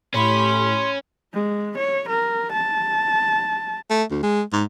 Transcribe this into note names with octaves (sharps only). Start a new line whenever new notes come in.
A2 C#4 G4 B5 C6
G#3
C#5
A#4
A5
A3
D2
G#3
G#2